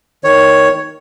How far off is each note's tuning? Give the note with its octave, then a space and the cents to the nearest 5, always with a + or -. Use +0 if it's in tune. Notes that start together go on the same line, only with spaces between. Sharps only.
D#3 +0 C#5 +0